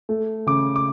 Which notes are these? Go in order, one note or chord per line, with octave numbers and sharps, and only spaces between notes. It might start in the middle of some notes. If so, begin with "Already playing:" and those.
A3
C#3 D6
D6